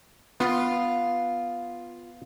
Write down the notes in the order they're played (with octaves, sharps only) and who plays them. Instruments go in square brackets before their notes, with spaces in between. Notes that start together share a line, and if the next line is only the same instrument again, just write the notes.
[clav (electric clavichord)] B3 [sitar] F4